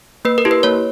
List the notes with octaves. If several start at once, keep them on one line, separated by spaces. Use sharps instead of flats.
A#3 B4
A#4
E4 G4
B4
A#3 C#5